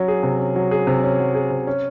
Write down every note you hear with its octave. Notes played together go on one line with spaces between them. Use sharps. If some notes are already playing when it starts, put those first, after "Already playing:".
Already playing: F#3 C#4
G#4
C3
C#4
F#3
G#4
C3
C#4
F#3
G#4
C3
C#4